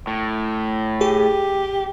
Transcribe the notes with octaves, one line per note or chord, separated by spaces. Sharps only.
A2
G4 G#4